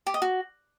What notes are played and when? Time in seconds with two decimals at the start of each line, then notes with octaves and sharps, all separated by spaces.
0.07 G4
0.14 D#5
0.22 F#4